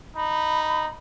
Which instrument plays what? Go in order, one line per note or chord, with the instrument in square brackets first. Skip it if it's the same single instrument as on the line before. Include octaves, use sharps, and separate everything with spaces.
[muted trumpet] D#4 [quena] B5